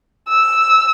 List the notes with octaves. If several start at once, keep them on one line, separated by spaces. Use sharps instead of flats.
E6